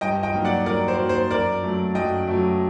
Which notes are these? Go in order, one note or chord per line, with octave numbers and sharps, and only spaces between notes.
G2 D#5 G5
D#5 G5
F#3 A#3 D#4 F#4
D5 F#5
G2 A#4 D5
C5
F#3 A#3 D#4 F#4
C5
F#2 A#4 D5
F#3 A3
F#2 D#5 G5
F#3 A3